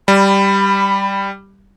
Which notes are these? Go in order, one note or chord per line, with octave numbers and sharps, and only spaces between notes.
G3 B5